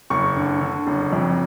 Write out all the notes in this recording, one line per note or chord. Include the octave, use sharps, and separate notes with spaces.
F#1 C#6
D3
D3
F#1
F2